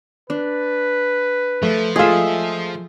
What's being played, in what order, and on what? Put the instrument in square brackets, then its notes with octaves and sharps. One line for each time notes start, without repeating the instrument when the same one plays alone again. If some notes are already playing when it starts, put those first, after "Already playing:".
[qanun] D4 [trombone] B4
[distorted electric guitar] F3 [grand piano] A3
[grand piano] G#3 A3 F4 [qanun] G#4 E5